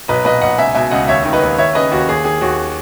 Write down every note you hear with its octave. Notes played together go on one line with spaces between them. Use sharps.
B1 B4 D#5
A#2 B4 D#5
B1 D#5 F#5
C#2 E5 G#5
B2 E5 G#5
C#2 D#5 F#5
D#2 C#5 E5
D#3
B4 D#5
D#2
D#2 C#5 E5
C#3 B4 D#5
D#2 F#4
D#2 G#4
D#3 G#4
D#2 F#4